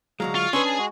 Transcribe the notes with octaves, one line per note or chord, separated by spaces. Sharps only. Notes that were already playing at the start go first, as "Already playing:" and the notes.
D2 F#3 G#3 F5 A#5
F4 F5 C#6 F6
C#4 D4 G#4 B4 G#5 C6 C#6 E6
A5
G#3 F#4